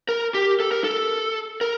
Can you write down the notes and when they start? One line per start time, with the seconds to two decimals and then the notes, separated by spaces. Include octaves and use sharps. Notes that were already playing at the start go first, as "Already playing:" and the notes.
0.09 A#4
0.34 G4
0.60 A4
0.72 A#4
0.84 A4
1.61 A#4